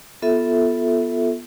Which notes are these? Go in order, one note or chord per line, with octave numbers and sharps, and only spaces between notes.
B3 F4 A4 E5